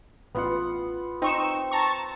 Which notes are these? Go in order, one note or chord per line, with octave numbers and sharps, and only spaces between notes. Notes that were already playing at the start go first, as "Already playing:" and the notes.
A1 B3 F4 F#5
C4 D#4 C#6 E7
A5 A#5 C#6